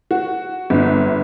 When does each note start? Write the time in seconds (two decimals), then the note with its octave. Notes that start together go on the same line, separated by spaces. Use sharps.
0.11 F#4
0.70 G1